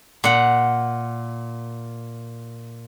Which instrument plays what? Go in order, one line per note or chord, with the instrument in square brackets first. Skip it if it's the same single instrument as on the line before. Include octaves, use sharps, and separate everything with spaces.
[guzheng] A#2 F#5